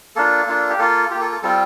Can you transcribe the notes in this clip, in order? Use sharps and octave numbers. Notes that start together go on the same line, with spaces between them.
A#3 D4 F4 A4
A#3 D4 F4
G4
A#3 F4 A4
A#3 F4 G4
A4
A4
G3 C4 F4 A4